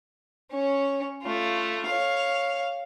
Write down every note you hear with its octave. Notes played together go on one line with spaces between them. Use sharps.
C#4 C#5
A3 F4
C#5 F5